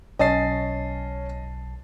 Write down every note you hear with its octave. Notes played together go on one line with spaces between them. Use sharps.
B1 C#4 C#5 D#5 A5 A6 C7